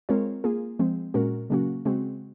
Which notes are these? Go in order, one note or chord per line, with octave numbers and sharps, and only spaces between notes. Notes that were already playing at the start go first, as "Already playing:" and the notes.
G#3 C4 F4 A#4 C#5
A#3 F4 G#4
F3 G#3 C4
A#2 G#3 C#4 F#4 A#4
C#3 F#3 A#3 C#4 F#4
C#3 G#3 C4 F#4